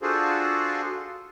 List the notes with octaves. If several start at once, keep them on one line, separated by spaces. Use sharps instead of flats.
D4 F4 F#4 G#4 A4 C5